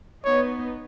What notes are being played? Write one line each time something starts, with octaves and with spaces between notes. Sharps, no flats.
B3 D#4 C#5